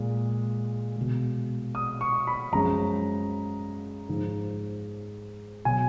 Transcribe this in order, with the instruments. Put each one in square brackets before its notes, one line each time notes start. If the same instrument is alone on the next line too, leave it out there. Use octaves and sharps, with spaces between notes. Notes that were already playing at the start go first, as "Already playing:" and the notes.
Already playing: [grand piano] A#2 G#3
B2 G#3
D#6
C#6
B5
F#2 F3 G#3 A#5
G#2 F3 G#3
B2 F#3 G#5